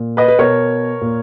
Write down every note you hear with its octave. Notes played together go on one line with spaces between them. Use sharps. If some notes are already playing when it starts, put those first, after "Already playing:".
Already playing: A#2
B4 D#5
B4
B2 A#4 C#5
A#2